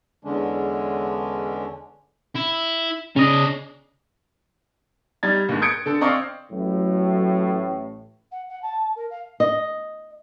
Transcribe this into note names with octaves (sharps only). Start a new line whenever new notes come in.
E2 D3 G#3 C#4 D4
E4
C#3 C#4 D5 D#5
G3 D#4 G#6 A6
D#2 G#2
D#6 G6 G#6 C#7 D7
D3 A4
C4 D5 D#5 F5 C#6
A1 A2 F#3
F#5
F#5
A5
A#4
F5
D#5